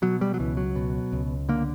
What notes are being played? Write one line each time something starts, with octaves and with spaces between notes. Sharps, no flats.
B2 F#3
G3
F#3
C#2 E3
F#3
B2
C#2
D3 A#3